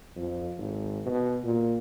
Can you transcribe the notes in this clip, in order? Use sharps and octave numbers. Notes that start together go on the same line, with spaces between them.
F2
G#1
B2
A#2